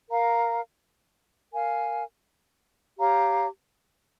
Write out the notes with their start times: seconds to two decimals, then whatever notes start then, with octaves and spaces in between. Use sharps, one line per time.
0.09 A#4 F5 A#5
1.53 A#4 F5 G#5
2.97 G4 C#5 F5 A#5